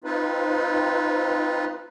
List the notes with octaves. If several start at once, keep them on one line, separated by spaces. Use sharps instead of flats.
C4 D#4 F4 B4